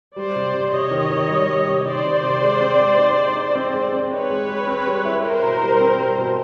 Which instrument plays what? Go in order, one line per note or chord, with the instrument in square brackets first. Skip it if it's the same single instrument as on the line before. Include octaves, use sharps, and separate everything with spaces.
[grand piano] G3 [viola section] C5 D5
[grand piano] C3
C3
[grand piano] C3 [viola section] C#5 D#5
[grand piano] D#3
D#3
G3
G3
C3
[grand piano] D#3 [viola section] C5 D5
[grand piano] C3
C3
G#3
C4
G#3
D#4
D#4
D#4
C4
G#3
C4
[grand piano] D#4 [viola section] B4 C#5
[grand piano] G#3
G#3
C4
G3
E4
[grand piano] E4 [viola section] A#4 C5
[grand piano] B2
G3
C4
G3
B2